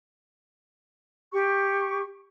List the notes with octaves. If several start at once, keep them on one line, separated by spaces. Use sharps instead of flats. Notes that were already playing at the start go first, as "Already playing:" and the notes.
G4 C#6